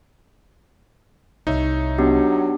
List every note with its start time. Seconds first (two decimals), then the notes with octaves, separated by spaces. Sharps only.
1.47 C2 D#4 C#5 E5
1.98 F#3 B3 D4 G4